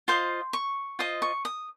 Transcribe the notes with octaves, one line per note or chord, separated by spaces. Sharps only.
F4 C5 D#5 C6
C#6
F4 C5 D#5 D#6
C#6
D#6